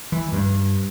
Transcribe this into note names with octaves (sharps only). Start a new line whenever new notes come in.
E3
G2